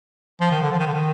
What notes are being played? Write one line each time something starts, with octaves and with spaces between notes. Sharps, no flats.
F3
D#3
D3
F3
D#3
D3
D#3